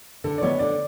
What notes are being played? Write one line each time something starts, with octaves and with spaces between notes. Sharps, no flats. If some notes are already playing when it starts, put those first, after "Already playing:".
D3 A4
D5
G#3 B3 C#5
D3 D5